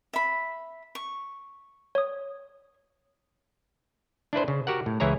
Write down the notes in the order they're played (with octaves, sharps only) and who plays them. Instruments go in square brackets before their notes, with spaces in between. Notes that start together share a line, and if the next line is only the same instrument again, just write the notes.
[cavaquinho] E5 B5
C#6
[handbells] C#5 D#6
[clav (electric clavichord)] D4 E4 B4 C5
C#3
F#4 G4 A#4 F#5
A2
C#2 E3 E4 G#4 C#5 A#5